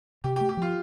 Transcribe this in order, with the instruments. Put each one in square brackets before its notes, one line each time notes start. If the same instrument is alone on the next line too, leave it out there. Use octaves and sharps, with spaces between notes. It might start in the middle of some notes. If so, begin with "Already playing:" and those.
[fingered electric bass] C3 [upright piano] G4
[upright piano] G4
[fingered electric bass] A3
[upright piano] G4
[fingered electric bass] F3 [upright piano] F4